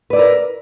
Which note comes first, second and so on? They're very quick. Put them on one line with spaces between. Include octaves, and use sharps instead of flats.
B4 D5 E4 A#4